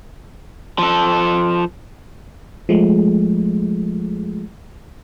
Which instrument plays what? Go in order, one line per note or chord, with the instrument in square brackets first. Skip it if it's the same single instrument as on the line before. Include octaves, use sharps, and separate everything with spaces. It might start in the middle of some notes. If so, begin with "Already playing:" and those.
[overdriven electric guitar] F3 A4
[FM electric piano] F3 G#3 A3